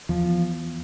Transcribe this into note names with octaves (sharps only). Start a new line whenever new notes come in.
E2 F3